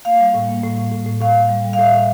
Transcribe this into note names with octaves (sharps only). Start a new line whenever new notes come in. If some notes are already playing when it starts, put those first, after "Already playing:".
A#3 F5
G3
A2
A#3
A2
A2
A2
A2
A2 F5
A2
G3
G3
F5
A2 E5
A2